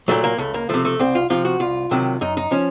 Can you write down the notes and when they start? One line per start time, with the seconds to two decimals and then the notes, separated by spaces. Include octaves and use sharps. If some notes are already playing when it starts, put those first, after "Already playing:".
0.08 A#2 F#3 A3
0.24 A#3
0.38 C#2 A3
0.54 A#3
0.69 C3 F3 A3
0.85 A3
0.99 C2 C4
1.15 F4
1.30 C3 F3 F4
1.45 F#4
1.60 C2 F4
1.91 C3 D#3 F#3
2.21 F#2 D#4
2.37 D#4
2.51 F3 C#4